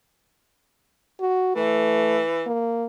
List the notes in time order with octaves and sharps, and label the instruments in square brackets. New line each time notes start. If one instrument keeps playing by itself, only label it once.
[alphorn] F#4
[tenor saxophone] E3 [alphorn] A3
[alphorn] A#3